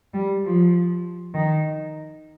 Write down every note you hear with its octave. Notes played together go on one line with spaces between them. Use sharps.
G3
F3
D#3